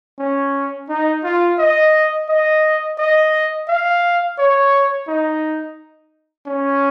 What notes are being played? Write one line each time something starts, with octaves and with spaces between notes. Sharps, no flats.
C#4
D#4
F4
D#5
D#5
D#5
F5
C#5
D#4
C#4